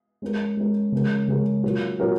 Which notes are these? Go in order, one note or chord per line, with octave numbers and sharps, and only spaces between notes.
G#3 C#4 A#4
G#3 C#4 A#4
C#3 G#3 C#4 A#4
C#3 G#3 C#4 A#4
A#2 F#3 C#4 F#4 A#4
A#2 F#3 C#4 F#4 A#4